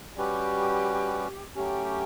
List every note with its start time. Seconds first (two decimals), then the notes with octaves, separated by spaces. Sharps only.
0.16 G3 C#4 F#4 G4 B4
1.55 F#3 A3 C#4 G4